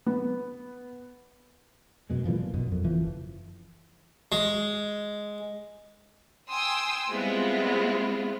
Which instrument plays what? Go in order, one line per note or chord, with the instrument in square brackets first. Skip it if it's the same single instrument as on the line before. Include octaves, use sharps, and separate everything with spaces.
[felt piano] B3
[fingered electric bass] F#2 B2 G#3
A#2 D3 E3 F3
A#2
F#2 B2
F2
F#1 E3 F3
[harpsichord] G#3
[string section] G5 G#5 C6 D#6 E6
G3 G#3 B3 C4 E4 F4